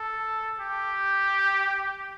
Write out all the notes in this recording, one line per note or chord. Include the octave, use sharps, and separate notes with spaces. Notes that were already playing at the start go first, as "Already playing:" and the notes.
Already playing: A4
G4